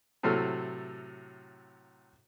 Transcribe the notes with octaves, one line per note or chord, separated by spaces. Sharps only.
A2 C3 F#3 A4 F6